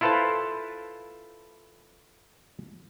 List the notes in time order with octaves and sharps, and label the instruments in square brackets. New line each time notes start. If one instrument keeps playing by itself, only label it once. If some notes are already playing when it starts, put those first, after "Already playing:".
[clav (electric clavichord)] E4 F4 A4 B4 C5 A5